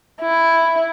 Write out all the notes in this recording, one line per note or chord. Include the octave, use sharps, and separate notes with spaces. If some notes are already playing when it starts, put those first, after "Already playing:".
E4